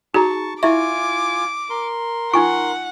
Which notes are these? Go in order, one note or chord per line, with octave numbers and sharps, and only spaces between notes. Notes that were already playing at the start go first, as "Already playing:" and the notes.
D#4 F#4 G#4 A5 A#5 C#6
E4 F4 E5 G#5 C#6 D6
A#4 C6
D#4 F4 F#5 G#5 C#6